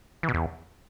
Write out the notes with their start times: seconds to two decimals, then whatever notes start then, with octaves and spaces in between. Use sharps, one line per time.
0.23 E3
0.29 B2
0.34 E2